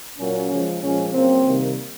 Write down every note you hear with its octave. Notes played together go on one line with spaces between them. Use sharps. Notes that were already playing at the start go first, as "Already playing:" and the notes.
A#2 F#3 A#3 C#4
C#3 F3 G#3
A#2 F3 G#3 C#4
C#3 F#3 A#3 C4
C3 D#3 G3 A#3